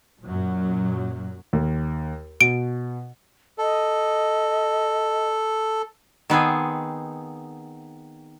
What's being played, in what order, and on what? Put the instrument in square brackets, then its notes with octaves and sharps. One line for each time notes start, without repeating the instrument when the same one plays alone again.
[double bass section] F#2 A#2 F#3
[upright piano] D#2
[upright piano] B2 [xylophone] D7
[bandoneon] A4 [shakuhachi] D#5
[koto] D#3 B3 C4 G#4